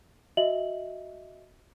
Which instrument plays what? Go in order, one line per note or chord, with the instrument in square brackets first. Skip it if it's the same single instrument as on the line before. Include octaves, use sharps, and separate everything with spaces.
[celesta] F#4 D#5 E5 F#7